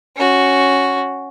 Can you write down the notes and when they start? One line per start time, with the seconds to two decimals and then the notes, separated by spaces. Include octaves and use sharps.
0.16 C#4 F#4